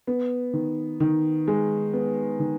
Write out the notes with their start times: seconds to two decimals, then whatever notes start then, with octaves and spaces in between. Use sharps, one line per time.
0.07 B3
0.53 D#3
1.00 D#3
1.48 G#3
1.93 B3
2.40 D#3